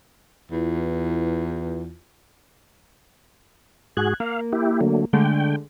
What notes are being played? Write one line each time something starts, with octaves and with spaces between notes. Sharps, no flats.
E2 E4 F4 B4
G#2 F#4 G#4 F#6 G#6
A#3 F5
E4 G4
D3 F#3 A3
D3 G#3 A3 G5